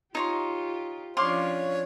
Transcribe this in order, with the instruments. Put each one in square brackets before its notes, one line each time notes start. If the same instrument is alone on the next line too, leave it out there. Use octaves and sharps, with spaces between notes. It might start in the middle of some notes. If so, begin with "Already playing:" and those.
[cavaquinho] D#4 C#5 C6 [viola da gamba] F4 G4
[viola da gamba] F3 C#4 D4 [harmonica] C#5 [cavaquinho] F5 C6 D6